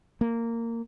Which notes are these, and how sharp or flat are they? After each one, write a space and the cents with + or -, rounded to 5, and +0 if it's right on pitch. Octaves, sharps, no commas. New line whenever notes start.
A#3 -15